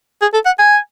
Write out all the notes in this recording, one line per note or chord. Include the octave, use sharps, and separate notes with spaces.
G#4
A4
F#5
G#5